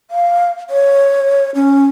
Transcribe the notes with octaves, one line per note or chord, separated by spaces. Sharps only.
F5
C#5
C#4